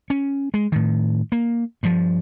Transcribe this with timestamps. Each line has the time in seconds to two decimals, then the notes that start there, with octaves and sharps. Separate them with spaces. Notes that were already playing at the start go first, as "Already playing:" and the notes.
0.10 C#4
0.54 G#3
0.72 A2 D#3
1.32 A#3
1.83 G2 F3